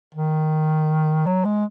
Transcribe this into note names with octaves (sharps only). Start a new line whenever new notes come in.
D#3
F#3
G#3